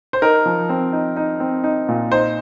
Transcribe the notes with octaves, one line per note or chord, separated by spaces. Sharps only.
C5
D#4 A#4
F3
C4
D#4
D#4
C4
D#4
A#2
D#4 C5